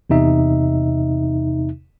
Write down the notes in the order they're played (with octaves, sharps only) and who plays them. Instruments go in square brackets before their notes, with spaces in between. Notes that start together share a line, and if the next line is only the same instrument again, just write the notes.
[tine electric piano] E2 C3 D#4 E5